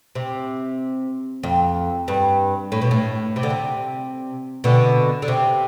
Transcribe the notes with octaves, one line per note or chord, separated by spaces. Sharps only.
C3
F2
G2
A2
B2
A2
C3
D3
C3
B2 D3
D3
C3